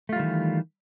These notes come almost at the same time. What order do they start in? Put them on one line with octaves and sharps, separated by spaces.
A3 F4 G3 D#3 E3